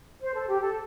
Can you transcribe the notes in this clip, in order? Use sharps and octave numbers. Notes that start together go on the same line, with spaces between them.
C5
A4
G4
A4